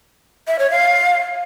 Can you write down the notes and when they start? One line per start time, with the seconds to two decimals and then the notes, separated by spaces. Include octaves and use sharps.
0.48 E5
0.59 C#5
0.70 F5